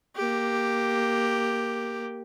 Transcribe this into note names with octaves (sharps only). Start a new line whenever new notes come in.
A#3 G4